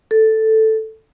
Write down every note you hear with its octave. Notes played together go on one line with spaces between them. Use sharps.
A4